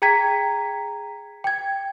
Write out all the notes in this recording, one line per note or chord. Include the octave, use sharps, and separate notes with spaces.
G#4 G5 A#5 G#6 B6
G5 G#6